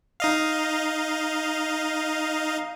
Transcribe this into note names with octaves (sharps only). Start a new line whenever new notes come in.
D#4 D#5 F5